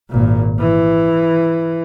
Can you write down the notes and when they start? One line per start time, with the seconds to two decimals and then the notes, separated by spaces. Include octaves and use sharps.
0.10 G#1 A#2
0.59 E3